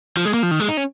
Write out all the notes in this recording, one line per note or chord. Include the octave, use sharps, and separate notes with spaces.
F3
G#3
A#3
F3
D#3
G#3
D#4
C#4